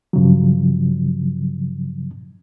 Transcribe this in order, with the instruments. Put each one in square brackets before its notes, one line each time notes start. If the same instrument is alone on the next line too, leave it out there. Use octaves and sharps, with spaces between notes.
[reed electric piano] G2 C#3 F3 F#3